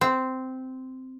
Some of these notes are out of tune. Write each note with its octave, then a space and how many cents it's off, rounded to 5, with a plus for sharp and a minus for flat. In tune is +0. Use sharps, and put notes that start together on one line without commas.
C4 -10